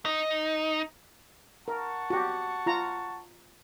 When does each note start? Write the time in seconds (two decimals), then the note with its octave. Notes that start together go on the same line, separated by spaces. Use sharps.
0.05 D#4
1.68 A#4 F#5 A5 C#6
2.10 F#4 G4
2.66 F4 A#5